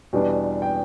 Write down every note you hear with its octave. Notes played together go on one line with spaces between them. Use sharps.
E2 B2 G3 B3 D4
G5